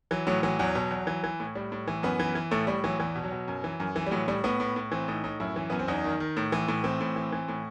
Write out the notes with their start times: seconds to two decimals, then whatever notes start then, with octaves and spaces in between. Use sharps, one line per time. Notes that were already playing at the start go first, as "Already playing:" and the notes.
0.11 E3 F#3
0.27 A2 F#3
0.43 E3 F#3
0.59 E2 F#3
0.75 B2
0.91 E2
1.07 E3
1.24 E3
1.40 A2
1.55 A2 G3
1.72 A2
1.88 E3
2.03 F#2 B3
2.19 E3
2.35 E3
2.51 A2 A3
2.67 A2 G3
2.84 E3 F#3
3.00 E2 E3
3.15 B2
3.23 F#3
3.32 B2
3.48 F#2
3.64 E3
3.80 F#2
3.96 E3
4.06 G3
4.11 A2 F#3
4.28 A2 G3
4.44 A2 B3
4.60 A2
4.76 A2
4.91 E3 C4
5.08 A2 D#4
5.24 A2 D#4
5.40 F#2 E4
5.56 E3
5.70 F#2 B3
5.79 C4
5.88 E2 D#4
6.04 D#3
6.20 D#3
6.37 A2
6.52 E3
6.68 A2
6.84 E3 C4
7.01 A2
7.16 E3
7.32 E3
7.48 A2